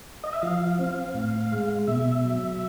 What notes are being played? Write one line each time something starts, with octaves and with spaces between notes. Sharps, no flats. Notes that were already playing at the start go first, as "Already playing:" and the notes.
D#5
E5
F3 F5
C4
A2
G#3
B2 E5
F#3